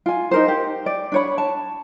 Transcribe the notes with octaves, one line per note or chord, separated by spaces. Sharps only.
F4 G#5
D#4 A#4 C5
G4
D5
D4 C#5 B5
A5